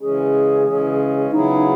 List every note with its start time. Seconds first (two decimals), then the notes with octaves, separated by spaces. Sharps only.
0.01 C#3 E3 G#3 C#4 G#4
0.65 C#3 E3 G#3 C#4
1.31 C#3 F#3 B3 D#4 E4 G#4